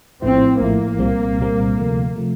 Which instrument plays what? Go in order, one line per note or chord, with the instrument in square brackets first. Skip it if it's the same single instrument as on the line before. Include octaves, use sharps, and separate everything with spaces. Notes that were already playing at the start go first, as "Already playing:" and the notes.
[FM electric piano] A#1 A2 F3 A3 E4 [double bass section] C4
[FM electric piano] A#1 A2 F3 A3 E4 [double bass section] A#3
[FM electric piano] C2 A#2 G3 C4
C2 A#2 G3 C4
D2 C3 F3 A3
C3 F3 A3